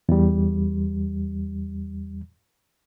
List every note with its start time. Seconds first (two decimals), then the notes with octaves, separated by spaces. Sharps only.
0.09 E2 G3